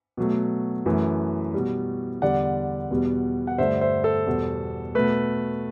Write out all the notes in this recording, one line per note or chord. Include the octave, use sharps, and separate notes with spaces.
B2 F#3 A3
F#2 E3 A3
B2 G3
E2 D3 G3 D5 F#5
E2 B2 G3
F#5
G2 D3 A3 C5 E5
C5 E5
A4 C5
E2 B2 G3
B2 A3 B4